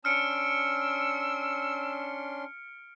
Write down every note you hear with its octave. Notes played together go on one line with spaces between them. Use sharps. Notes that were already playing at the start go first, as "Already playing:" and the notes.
C#4 D4 C6 E6 F6 C#7 D7